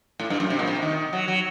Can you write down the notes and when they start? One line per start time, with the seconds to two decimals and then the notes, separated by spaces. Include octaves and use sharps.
0.20 A2
0.30 G2
0.40 F#2
0.50 C3
0.59 A#2
0.68 C3
0.82 D#3
1.13 F#3
1.28 F#3